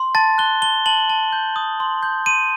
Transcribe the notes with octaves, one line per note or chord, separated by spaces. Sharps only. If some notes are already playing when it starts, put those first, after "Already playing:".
Already playing: C6
A5 A6
F#6 G7
A5 G7
A5 F#7
A5
G6
D#6
C6
G6
C6 D#7